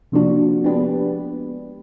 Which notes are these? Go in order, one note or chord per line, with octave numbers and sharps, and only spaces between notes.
C3 F3 A#3 D4 F#4
G#3 B3 D4 G4 B4